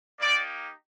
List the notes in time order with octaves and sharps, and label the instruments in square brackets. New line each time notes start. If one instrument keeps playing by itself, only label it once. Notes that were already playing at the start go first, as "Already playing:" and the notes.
[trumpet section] A#3 D#4 G4 D5